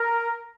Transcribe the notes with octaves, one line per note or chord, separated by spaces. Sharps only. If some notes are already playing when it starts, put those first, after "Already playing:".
Already playing: A#4